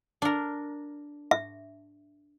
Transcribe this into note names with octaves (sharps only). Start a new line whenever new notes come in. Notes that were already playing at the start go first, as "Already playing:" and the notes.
D4 A#4
E5